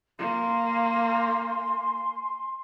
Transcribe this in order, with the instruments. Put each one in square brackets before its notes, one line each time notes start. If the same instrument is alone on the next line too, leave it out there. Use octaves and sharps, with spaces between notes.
[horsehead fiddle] A#3 [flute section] G#5 C6